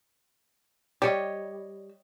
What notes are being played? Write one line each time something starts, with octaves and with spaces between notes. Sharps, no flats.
G3 G4 C#5 D#5